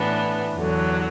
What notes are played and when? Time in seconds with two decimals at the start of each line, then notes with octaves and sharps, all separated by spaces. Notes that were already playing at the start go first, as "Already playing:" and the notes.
Already playing: A2 E3 B3 D4
0.56 E2 D3 F#3